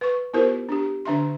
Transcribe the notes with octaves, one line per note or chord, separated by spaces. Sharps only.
B4 C#6
B3 E4 F4 G4 A#4 C5
D4 G4
D3 D4 E5 C6